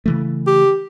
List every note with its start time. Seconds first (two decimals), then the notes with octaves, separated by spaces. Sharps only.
0.06 C#3 E3 A3
0.47 G4